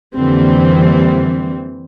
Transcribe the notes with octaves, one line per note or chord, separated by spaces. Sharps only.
F2 D3 E3 G3 A#3 C4